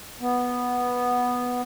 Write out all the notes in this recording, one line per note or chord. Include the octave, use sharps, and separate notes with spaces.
B3